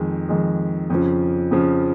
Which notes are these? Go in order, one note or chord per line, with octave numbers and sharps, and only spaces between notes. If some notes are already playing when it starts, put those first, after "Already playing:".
Already playing: F2 D#3 G#3
F2 D#3 G#3
F2 C#3 F3
F2 C#3 F3